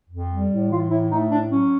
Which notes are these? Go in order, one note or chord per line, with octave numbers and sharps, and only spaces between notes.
F2
G3
A2
E3 F4
A2 E4
A3 D#4
A2 D4
F#3 C#4